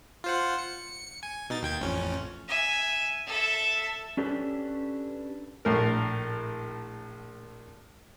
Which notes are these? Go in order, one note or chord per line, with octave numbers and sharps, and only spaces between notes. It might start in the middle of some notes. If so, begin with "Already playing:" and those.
F4 C5 F#5
C#7
G#5
B2 D#4 A6
D#2 G5 G#6
A1 F2 C#4
E5 G#5
A4 E5
C#4 D4 G4 A4 B4
A#1 A2 A#4